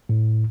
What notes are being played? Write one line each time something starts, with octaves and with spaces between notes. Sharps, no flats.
A2